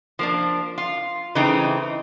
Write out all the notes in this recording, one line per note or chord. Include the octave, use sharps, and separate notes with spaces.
F3 A#3 D4
F4
C#3 E3 A3 C4 D#4